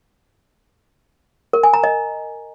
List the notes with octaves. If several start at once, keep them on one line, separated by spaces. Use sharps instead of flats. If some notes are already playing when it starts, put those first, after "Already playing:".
A#4
G#5
A#5
D#5